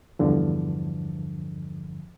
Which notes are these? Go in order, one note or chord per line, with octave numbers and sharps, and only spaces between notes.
E2 G2 D3 F3